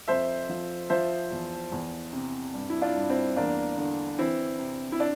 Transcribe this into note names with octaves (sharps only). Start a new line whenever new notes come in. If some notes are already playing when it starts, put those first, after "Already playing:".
F2 C5 E5
F3
F3 C5 E5
E2
E2
C3
G2
E4
D4 F4
G2
C4 E4
E2 A#3 D4
D3
E3 C4 E4
C3
E4
D4